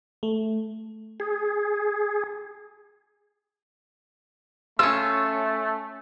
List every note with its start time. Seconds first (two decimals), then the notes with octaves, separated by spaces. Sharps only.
0.23 A3
1.20 G#4
4.79 A3 C#4 F4 E6